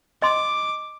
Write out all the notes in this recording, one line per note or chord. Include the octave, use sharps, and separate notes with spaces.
D#5 C6 D6